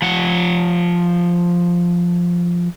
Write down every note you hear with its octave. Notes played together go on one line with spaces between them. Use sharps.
F3 F#5